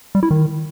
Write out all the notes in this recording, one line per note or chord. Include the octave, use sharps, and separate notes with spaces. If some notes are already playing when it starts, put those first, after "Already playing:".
G3
E4
D#3